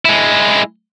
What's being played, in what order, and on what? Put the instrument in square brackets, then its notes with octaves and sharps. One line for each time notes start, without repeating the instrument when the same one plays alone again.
[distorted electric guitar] G#3 E4